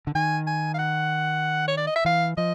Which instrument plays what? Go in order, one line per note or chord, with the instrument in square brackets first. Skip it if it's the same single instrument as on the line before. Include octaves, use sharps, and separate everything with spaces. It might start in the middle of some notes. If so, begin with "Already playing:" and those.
[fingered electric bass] D3
[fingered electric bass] D#3 [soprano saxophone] G#5
[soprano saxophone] G#5
F5
F#5
C#5
D5
D#5
E5
[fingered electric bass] E3 [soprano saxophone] F5
[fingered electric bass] F3 [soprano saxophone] D#5